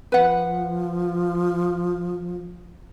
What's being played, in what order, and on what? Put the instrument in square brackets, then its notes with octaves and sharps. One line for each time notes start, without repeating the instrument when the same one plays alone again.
[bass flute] F3 [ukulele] B4 F#5